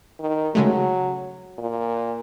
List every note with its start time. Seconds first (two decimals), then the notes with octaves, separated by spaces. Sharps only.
0.20 D#3
0.55 C#3 F#3 G#3 A3
1.59 A#2